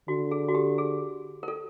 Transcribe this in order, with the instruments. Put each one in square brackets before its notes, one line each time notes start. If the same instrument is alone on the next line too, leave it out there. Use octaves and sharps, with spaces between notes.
[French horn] D3 [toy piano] F#4
[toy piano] G#4
F#4
G4
G#4
A#4
A4